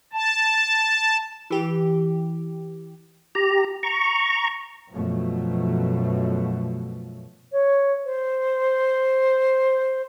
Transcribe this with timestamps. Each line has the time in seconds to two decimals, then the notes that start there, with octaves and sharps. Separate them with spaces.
0.13 A5
1.50 E3 G4
3.35 G4 A#5
3.83 A#5 C#6
4.92 F#2 B2 F3 A3
7.51 C#5
8.05 C5